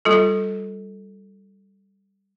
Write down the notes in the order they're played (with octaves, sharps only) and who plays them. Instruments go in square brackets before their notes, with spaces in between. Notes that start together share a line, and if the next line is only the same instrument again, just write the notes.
[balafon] G3 F4 A4